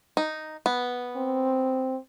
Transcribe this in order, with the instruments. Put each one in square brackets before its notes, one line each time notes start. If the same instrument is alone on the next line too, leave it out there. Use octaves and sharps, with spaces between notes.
[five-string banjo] D#4
B3
[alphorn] C4